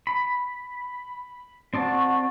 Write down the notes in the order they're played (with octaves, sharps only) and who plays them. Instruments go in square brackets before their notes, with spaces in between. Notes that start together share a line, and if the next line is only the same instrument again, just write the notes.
[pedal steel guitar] B5
[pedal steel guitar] C4 D5 A5 [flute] F#4